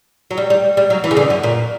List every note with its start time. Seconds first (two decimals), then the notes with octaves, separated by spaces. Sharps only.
0.31 F#3
0.38 G3
0.50 G3
0.77 G3
0.90 F#3
1.04 E3
1.11 C#3
1.17 D3
1.30 F#2
1.43 A#2